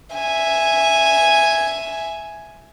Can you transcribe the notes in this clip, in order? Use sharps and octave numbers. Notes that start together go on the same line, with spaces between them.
E5 G#5